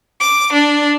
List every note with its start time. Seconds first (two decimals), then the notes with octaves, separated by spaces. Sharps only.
0.20 D6
0.52 D4